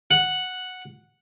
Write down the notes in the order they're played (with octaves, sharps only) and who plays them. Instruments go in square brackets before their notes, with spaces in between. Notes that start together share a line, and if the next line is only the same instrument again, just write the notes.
[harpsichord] F#5